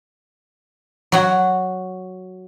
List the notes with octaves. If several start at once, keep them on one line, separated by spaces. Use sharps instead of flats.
F#3 F#4